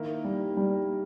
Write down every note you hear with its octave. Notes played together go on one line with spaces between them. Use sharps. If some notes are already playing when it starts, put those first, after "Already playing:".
Already playing: D#3 A#3 E4 A#4
G3
G3